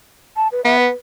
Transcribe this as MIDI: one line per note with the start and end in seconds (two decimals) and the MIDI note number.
0.36 0.48 81
0.52 0.63 71
0.65 0.87 59
0.65 0.77 76
0.79 0.94 71